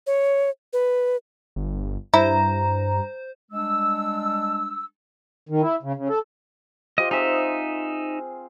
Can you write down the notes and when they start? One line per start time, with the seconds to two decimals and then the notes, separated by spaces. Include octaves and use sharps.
0.07 C#5
0.73 B4
1.56 G1
2.14 G2 E4 C5 A#5
3.51 G3 G#3 D4 E6
5.49 D#3
5.62 E4
5.83 C#3
5.96 C#3
6.09 A4
6.98 F4 G4 C5 D#5
7.11 C4 D#4 G#4 E5